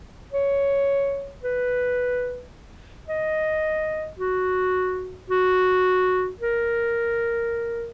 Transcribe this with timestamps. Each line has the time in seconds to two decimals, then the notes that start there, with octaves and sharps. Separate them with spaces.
0.32 C#5
1.43 B4
3.08 D#5
4.19 F#4
5.30 F#4
6.40 A#4